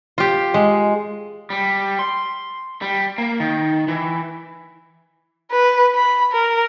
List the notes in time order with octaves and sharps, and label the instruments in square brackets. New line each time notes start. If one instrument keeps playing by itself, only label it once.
[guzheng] F4 G4
G#3
[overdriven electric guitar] G3
C6
G3
A#3
D#3
E3
[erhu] B4
B5
A#4